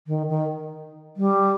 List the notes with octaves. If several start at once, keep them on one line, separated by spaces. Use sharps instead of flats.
D#3
D#3
G3